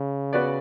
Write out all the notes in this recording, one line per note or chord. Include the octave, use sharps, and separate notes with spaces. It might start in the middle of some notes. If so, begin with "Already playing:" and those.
Already playing: C#3
B3 F#4 B4 D5